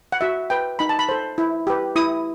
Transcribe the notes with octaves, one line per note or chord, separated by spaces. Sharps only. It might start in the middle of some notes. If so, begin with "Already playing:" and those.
F#5
F#4 E5
B4 G5
D#4 B5
A5
B5
A4 C5
E4
G4 B4
E4 D#6